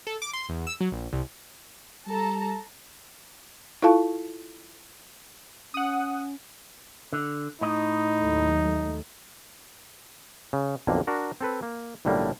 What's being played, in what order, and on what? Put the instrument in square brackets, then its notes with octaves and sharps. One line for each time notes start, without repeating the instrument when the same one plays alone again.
[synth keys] A4
D6
C6
E2
E6
F#3
A#1
C2
[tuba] G3 [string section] A4 A5 A#5
[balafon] E4 F4 A4 F5 A5 C#6
[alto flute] C#4 [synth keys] F#5 D#6
[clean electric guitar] D3
[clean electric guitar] A2 D#5 [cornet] D#4
[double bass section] D#2 F#3 A3
[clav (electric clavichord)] C#3
B1 F2 D3 A#3
D4 F#4 A#4
C4 A4 B4
A#3
B1 A2 D3 G3 A#3